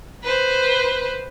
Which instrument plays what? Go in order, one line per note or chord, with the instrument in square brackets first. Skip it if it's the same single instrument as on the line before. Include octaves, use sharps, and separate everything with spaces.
[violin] B4 C5